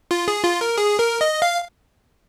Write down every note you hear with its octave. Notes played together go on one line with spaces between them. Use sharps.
F4
G#4
F4
A#4
G#4
A#4
D#5
F5